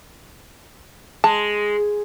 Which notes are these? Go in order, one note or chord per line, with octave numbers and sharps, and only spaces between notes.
G#3 A5